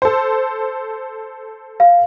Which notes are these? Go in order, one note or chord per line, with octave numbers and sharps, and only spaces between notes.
A4 C5
F5